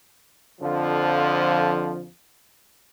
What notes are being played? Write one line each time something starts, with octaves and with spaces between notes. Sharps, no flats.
F2 D3 F3